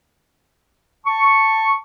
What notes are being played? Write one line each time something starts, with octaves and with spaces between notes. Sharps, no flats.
A5 C#6